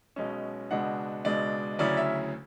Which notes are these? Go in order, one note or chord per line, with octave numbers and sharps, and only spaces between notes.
B1 B2 G#3 C#4
C#2 B2 G#3 D4 F#5
C#2 B2 G#3 D4 D5
D2 C#3 F#3 C#4 E4 D5
E5